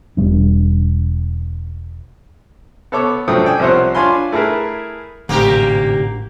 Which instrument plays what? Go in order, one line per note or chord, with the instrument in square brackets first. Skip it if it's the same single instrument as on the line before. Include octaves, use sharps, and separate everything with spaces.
[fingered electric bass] E1 G3 D4
[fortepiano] B3 A4 C#5 D6
G2 F3 F#3 A3 G5 D#6
A4 D5 G5 G#5
C2 C3 F3 C5 C#5 F#5
D4 F4 C#5 G#5 B5 C6
A3 E4 G#4 A#4 B4
[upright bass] A1 [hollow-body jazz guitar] D2 G#2 C3 [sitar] A#3 G4 A#4